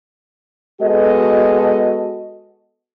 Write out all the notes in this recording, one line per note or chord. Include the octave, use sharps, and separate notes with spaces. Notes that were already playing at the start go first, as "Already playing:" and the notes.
G#3 B3 F#4 A4 D#5